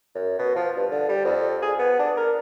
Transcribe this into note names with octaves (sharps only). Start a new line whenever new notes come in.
F#2
B2
F3
G2
D3
G3
F2
G#4
B3
D4
A#4